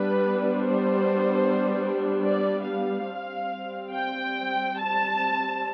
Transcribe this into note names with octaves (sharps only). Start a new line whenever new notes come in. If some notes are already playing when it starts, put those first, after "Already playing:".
Already playing: G3 B3 D4 B4
C5
D5
F5
G3 C4
G5
A5